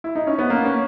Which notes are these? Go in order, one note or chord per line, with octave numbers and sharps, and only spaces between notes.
E4
D#4
C#4
B3
A#3
C#4